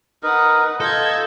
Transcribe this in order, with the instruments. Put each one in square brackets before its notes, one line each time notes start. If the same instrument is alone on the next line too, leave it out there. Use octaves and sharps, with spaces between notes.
[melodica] D#4 A#4 [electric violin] B4 F#5
[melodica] F4 D#5 [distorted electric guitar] A4 [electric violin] G6 G#6